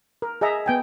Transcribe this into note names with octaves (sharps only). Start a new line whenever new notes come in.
A#4
G#4 D#5 E5 A#5
B3 G5 G#5